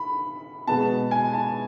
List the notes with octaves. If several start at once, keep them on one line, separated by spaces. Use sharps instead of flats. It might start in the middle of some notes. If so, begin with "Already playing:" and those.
Already playing: B5
B2 G#3 B3 A5
G#5
A5